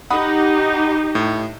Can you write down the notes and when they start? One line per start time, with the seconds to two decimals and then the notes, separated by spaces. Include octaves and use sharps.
0.10 D#4 G4 F#5 B5 D#6
1.15 A2